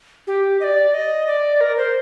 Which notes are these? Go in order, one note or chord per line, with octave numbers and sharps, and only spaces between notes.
G4
D#5
D5
D#5
D5
A#4
C5